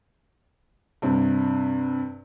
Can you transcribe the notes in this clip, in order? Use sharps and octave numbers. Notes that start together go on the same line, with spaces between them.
G2 C3